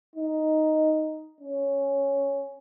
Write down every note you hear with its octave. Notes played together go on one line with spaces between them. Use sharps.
D#4
C#4